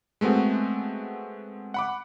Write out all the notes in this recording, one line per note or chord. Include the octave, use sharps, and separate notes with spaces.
G#3 A3 B3 C4 F#4
F#5 B5 D6